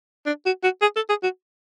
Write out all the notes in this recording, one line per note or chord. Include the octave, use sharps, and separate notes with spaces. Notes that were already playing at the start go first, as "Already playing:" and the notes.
D4
F#4
F#4
G#4
A4
G#4
F#4